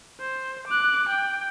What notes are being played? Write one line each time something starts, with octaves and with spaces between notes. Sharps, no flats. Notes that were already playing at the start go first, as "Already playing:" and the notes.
C5
D6 F#6
G5